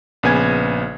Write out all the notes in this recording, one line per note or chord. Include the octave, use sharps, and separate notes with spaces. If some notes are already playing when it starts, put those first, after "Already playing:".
A#1 C#3 B3 G#5 G#6